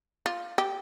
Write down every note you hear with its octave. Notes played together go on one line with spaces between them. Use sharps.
F4
G4